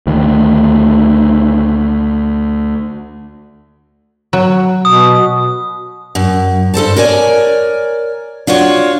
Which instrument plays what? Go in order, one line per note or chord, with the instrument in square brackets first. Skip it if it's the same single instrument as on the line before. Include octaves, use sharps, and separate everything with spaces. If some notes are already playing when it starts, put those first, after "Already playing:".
[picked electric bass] D2 D#3
[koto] F#3
[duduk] B2 [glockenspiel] D#6
[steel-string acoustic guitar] F#2
G2 A4 C5 A5
A#4 C#5 D5 G#5
D4 F4 F#4 C#5